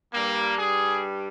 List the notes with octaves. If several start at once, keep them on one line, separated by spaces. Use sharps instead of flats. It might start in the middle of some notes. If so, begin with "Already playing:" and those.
G2 G3 A#3
G#4